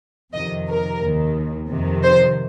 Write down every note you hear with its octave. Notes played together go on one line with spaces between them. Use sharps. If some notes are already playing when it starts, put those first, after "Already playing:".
F2 C3 D#3 D#5
A#4
D#2 D#3
F2 C3 D#3
C5